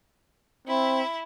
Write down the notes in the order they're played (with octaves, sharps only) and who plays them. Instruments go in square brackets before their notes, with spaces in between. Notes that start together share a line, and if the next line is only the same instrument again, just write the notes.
[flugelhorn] C4 [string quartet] E4